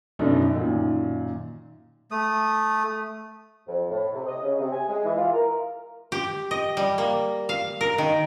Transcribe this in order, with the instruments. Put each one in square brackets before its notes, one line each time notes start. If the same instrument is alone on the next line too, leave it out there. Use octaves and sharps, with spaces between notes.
[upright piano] F#2 B2 A3 B3 D4 D#4
F#2 A#2 D#3
[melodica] A3 D#6
[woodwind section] F2
A2
C3
D#5
C#3
C3
G#5
G#3
E3
F4
A#4
[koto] G4
D#5
G3
A#3
F5
A#4
D#3